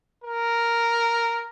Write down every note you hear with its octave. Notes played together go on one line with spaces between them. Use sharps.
A#4